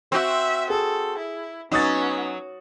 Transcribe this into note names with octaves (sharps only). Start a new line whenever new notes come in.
C4 F#4 E5
G#4 A4
E4
F#3 B3 C#4 D#4 D#6 A6